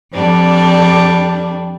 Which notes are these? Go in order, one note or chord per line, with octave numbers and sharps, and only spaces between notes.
F2 G3 D4